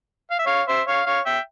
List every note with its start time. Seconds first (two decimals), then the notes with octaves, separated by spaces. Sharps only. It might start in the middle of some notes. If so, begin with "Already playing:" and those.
0.31 F5
0.39 E5
0.46 C#5 F5
0.68 C5 E5
0.88 C#5 F5
1.06 C#5 F5
1.26 E5 G5